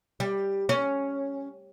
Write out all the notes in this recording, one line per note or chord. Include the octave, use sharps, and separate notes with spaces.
G3
C#4